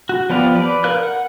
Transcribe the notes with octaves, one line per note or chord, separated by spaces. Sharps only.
F#4
F3 B3 G4 D5 F5
B4 D5
A#4 B4 F5 F#6
F#5